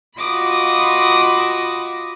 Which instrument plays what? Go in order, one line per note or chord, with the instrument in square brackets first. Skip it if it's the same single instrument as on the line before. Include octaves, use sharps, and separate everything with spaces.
[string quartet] F4 F#4 D#5 B5 D6 D#6